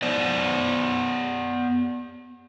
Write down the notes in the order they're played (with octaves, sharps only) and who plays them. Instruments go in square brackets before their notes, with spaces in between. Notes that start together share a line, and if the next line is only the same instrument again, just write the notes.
[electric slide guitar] B3 C5 D5